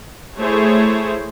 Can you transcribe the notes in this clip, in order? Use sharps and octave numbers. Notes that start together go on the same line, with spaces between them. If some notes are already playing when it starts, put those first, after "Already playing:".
A3 E4 G#4 C5 C#5